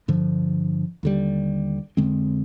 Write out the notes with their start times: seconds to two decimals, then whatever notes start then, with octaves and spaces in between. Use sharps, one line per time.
0.08 G2 D3 F3
1.03 D#2 D3 G3
1.97 F2 D3 G#3 C4